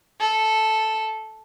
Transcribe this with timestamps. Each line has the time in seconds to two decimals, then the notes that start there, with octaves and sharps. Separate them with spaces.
0.20 A4